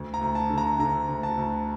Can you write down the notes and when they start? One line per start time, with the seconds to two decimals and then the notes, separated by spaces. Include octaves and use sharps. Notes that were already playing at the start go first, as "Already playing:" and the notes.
Already playing: D2
0.14 A#5
0.21 D2
0.35 A5
0.50 D3
0.58 A#5
0.79 D3 A#5
1.09 D2
1.23 A5
1.37 D2